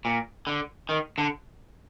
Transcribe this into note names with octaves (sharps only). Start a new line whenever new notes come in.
A#2
D3
D#3
D3